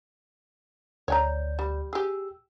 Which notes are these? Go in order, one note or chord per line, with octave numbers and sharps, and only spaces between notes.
D2 C#5 D5 G#5 A#5 G6
G3
G4 G#4 E6